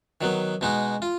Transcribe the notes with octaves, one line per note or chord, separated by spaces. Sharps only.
D#3 F#3 B3
B2 G#3 D#4 F#4
F4